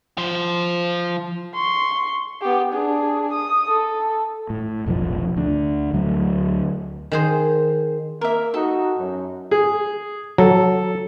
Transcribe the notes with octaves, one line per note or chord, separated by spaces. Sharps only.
F3 C5
C6 C#6
B3 G4
D4 G#4
D#6
A4
A2
F1 B1 B2 F3
D2 D3
D2 F#3 A3
D#3 G#4 C5
A#3 A#4 E5
D#4 F#4 A4
F#2
G#4
F#3 A4